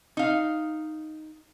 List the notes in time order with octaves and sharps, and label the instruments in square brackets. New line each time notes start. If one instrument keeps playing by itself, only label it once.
[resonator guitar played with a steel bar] D#4 F5